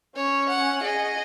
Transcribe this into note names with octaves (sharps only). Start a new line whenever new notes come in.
C#4 C#5
F#5
G#4 D#5